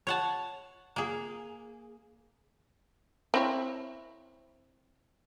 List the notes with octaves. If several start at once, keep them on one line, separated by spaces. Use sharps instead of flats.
C#5 F#5 A5
A#3 G#4
C4 E4 C#5